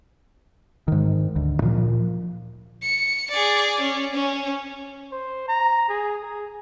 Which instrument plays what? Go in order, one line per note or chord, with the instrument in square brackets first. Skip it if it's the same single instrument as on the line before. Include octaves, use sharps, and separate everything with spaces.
[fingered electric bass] G#2 D#3
D2
A#2 F3
[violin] C#7
G#4 D5
C#4
C#4
[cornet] C5
A#5
G#4
G#4